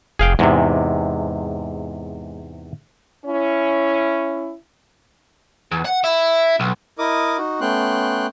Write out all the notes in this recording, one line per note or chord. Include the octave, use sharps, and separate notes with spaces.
F1 G#4 F5 G5
E2 G#2 C3 G#3
C#4 E4
E2
F#5
E4
B1
E4 A#4 D#5 D6 D#6
D#4 F#4
A3 B3 C#4 G5 C6 F#6